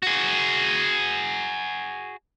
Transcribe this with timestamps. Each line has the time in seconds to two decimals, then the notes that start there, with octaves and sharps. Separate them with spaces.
0.03 F#4 G#4